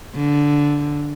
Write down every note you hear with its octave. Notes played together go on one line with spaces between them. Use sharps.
D3